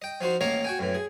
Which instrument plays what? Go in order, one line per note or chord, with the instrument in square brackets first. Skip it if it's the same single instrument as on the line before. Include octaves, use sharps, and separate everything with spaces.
[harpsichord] D#5 G5
F3 D#4 F#4 C5
A1 A#3 C#5 D#5 F5 A#5
F#4 G5 G#5
F#2 A2 E3
G#4